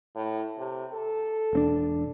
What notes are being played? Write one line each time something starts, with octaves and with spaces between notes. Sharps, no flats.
A2
C3
A4
E1 C4 D4